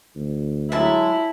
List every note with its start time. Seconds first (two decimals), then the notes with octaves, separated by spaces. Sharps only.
0.15 D2
0.72 F#3 G#3 E4 E5 A5